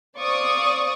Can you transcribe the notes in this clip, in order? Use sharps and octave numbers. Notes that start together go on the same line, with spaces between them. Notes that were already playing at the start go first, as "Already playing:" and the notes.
C5 D5 F5 C#6 D#6